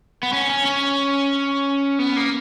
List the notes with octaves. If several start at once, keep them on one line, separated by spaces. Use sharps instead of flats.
B3
C#4
C#4
C#4
B3
A#3